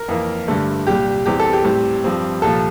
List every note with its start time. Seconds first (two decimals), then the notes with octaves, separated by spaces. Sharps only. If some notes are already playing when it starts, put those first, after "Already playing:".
Already playing: A#4
0.08 F2 E3 A#3
0.48 G2 D3 A3
0.87 C2 A#2 G3 G4
1.26 E2 E3 G3 C4 G4
1.40 A4
1.53 G4
1.65 A2 G3 C4
2.04 G2 F3 C4
2.42 C2 A#2 F3 A4